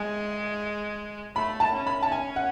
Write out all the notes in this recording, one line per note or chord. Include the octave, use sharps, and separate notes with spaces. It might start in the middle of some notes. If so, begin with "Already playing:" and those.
Already playing: G#3 G#5
A3 B5
A5
C#4
B5
A5
G#5
F#5